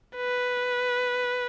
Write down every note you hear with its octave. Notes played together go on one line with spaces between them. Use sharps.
B4